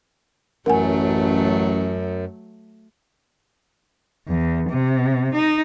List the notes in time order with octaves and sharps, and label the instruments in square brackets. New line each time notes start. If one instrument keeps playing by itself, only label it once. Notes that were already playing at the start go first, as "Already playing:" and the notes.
[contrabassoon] A1 [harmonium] F#2 [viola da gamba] F#3 A3 [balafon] A#4 F#5 G#5
[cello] E2
C3
D#4